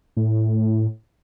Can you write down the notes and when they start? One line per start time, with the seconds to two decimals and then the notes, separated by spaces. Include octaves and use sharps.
0.17 A2